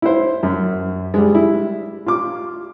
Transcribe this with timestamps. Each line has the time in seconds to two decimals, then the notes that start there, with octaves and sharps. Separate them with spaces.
0.02 E4 C5
0.43 F#2
1.14 G3 G#3
1.35 E4
2.06 F4 D6